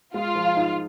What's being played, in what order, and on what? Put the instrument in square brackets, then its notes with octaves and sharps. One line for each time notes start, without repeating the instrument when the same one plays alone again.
[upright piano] G#3 [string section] F4
[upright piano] F3
D#4